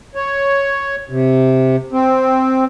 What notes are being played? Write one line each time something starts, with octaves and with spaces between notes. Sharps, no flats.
C#5
C3
C4